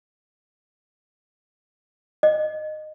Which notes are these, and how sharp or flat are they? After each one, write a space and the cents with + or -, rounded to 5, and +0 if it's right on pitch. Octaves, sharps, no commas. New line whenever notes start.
D#5 -15